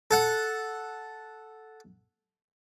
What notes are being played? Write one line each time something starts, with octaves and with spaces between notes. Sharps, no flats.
A4 F#5